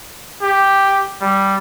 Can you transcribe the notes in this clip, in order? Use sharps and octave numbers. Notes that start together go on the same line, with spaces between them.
G4
G3